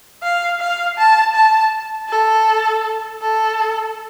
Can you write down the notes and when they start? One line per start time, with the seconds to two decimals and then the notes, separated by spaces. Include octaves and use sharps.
0.23 F5
0.60 F5
0.98 A5
1.34 A5
2.09 A4
3.22 A4